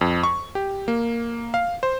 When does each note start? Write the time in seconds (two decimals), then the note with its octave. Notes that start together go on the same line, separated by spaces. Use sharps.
0.01 F2
0.23 C#6
0.55 G4
0.88 A#3
1.54 F5
1.83 C5